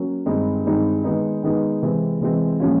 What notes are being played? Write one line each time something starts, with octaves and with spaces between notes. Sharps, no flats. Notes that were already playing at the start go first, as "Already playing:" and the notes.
Already playing: F#3 A#3 C#4
G2 D#3 G#3 C4 D#4
G2 D#3 G#3 C4 D#4
D#3 G#3 B3 D#4
D#3 G#3 B3 D#4
C3 E3 G#3 C4
C3 E3 G#3 C4
A#2 F3 G#3 C#4 F4